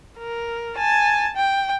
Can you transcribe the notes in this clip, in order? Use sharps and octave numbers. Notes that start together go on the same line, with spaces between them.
A#4
G#5 A5
G5